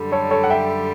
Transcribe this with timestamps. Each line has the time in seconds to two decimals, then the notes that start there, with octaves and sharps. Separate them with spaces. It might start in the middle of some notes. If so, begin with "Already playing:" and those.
Already playing: F#2 D3 G3
0.12 A4 C#5
0.31 A4 C#5
0.44 F#5
0.50 E5 G5